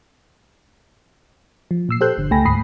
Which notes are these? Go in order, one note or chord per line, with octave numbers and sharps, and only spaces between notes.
F3
A#2 E6 C7
G4 A4 C5 E6 F#6 G6
G1 D3
C#2 A3 G5 G#5 B5 A#6
D2 G#2 B5 D#6 C7